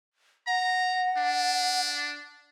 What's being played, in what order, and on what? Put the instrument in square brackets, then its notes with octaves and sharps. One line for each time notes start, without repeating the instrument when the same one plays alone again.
[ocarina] F#5 [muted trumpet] A#5
[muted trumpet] D4